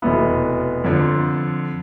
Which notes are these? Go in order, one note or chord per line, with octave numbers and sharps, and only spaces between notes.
F1 E2 B2 B3 E4
F2 D3 F3